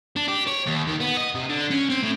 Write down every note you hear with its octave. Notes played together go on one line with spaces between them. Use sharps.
D4
G4
C#5
D#2
D#3
B3
D#5
C3
D3
C#4
C4
A2